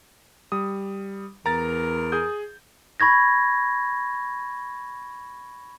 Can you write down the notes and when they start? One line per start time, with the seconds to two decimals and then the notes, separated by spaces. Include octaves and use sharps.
0.52 G3 D#6
1.46 E2 A#4 A#5 A6
2.12 G#4 D#6 G6
3.00 B5 C#6 G#6 A#6